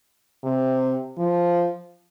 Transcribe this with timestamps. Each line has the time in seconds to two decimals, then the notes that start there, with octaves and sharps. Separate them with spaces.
0.44 C3
1.18 F3